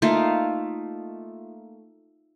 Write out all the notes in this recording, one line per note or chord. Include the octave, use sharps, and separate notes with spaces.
A3 A#3 D#4 F4